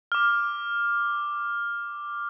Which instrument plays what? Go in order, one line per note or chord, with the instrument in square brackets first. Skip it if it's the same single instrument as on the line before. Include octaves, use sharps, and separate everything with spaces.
[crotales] D6 F6